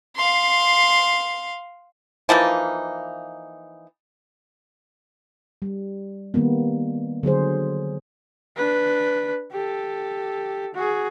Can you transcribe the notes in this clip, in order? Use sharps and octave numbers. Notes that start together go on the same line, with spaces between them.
F5 C6
E3 F3 A#3 D#4
G3
D#3 G3 A#3 B3
D3 F#3 G#4 C5
D4 B4
G4 A4
F#4 G#4